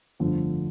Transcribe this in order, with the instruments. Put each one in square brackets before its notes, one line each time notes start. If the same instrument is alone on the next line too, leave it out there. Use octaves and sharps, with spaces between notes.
[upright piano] G1 F2 D3 F3 A3